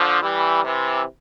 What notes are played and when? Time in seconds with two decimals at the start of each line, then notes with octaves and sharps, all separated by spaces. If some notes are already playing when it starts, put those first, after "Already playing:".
Already playing: D3 F3
0.22 E3 G3
0.64 C3 E3